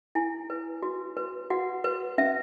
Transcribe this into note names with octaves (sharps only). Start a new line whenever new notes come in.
E4 G#5
B4
F#4
B4
F#4 F#5
B4
C#4 E5